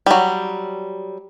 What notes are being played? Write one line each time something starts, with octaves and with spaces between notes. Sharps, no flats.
F#3 G3